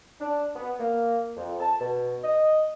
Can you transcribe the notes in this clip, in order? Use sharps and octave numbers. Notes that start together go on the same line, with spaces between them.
D4
B3
A#3
F2
A5
B2
D#5